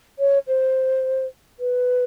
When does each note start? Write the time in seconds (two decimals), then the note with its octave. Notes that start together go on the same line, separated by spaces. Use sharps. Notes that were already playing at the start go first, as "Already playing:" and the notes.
0.19 C#5
0.48 C5
1.60 B4